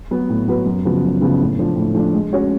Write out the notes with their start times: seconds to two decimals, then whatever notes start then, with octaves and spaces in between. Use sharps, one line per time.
0.11 F#3 B3 F#4 B4
0.29 A2
0.48 F#3 B3 F#4 B4
0.66 F#2
0.85 C#3 F3 B3 F#4
1.03 F#2
1.21 C#3 F3 B3 F#4
1.40 A2
1.59 F3 A3 D4
1.76 A2
1.95 F3 A3 D4
2.13 G#3
2.33 C#4 F#4 C#5